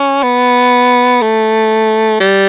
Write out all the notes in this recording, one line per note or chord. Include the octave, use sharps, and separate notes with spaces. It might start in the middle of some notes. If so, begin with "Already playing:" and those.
Already playing: C#4
B3
A3
G3